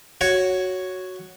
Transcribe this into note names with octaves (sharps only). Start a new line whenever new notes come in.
F#4 C#5